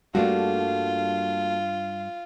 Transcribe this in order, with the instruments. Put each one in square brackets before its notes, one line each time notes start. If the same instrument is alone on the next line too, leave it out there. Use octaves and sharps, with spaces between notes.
[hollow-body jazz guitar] G2 G3 D4 [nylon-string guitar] A3 A#3 F#4 [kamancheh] F4